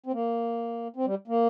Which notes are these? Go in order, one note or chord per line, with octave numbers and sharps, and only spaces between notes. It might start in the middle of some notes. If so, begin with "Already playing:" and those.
C4
A#3
C4
G3
A#3